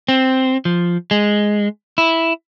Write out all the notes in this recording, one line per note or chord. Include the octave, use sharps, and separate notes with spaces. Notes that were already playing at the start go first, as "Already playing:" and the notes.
C4
F3
G#3
E4